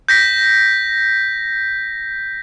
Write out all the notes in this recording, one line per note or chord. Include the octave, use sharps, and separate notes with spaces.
G6 A#6 B6